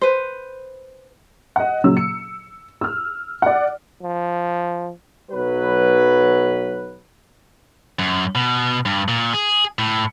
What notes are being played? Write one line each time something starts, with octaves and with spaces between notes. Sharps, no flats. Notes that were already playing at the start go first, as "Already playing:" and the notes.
B4 C5
D#5 F#5
A#2 C#3 F#3 E6
C#7
E6 F6
D5 F#5
F3
B1 F#3 B4
F#2
B2
G2
A#2
G#4
A2